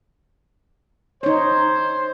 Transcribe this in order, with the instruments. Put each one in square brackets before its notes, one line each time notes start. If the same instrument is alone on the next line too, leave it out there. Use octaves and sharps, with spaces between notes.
[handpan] D#4 C#5 [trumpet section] C5